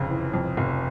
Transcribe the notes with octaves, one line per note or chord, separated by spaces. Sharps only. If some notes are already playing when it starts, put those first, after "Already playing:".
Already playing: F1 F2 C#3
E3
F2
F1